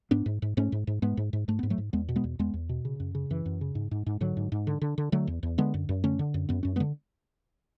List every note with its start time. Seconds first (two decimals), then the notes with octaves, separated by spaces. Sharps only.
0.11 G#2 B3 D4
0.26 G#2
0.42 G#2
0.57 G#2 A3 C#4
0.72 G#2
0.87 G#2
1.02 G#2 G#3 B3
1.17 G#2
1.33 G#2
1.48 G#2 A3
1.59 G#2 B3
1.70 F#3 A3
1.78 G#2
1.93 E2 G#3 B3
2.09 B2
2.16 G#3 B3
2.24 E2
2.39 E2 G#3 B3
2.54 E2
2.69 B2
2.85 C#3
3.00 F#2
3.15 C#3
3.30 F#2 E3
3.46 F#2
3.61 C#3
3.75 G#2
3.91 G#2
4.06 G#2
4.21 G#2 D3 F#3
4.37 G#2
4.52 G#2
4.67 D3
4.82 D3
4.98 D3
5.12 D3 F#3 A3
5.27 E2
5.43 E2
5.58 D3 G#3 B3
5.74 F#2
5.89 F#2
6.04 D3 A3 C#4
6.19 D3
6.34 F#2
6.49 F#2 B3
6.63 F#2 C#4
6.76 G#3 B3
6.80 D3